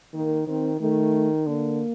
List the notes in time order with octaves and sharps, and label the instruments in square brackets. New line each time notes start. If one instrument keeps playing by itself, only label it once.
[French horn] D#3 [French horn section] A#3
[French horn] D#3 [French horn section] C4
[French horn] D#3 [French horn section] A3
[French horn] D3 [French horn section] A#3